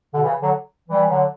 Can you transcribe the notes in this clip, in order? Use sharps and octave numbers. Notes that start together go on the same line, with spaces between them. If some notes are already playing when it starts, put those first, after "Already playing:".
B2 D3
C#3 E3
D3 F#3
E3 G3
D3 F#3